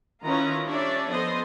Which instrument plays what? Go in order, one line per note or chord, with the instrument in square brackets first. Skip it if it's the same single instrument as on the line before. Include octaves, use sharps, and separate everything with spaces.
[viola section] D#3 C#4 E4 F4 B4 A#5
G3 C#4 D4 C#5 D5 E5
F3 B3 A4 C5 D#5 C6